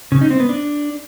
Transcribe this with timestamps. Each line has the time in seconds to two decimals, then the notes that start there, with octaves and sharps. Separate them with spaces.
0.12 C#3
0.21 D#4
0.30 C4
0.40 B3
0.49 D4